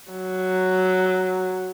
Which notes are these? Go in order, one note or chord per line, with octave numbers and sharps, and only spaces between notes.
F#3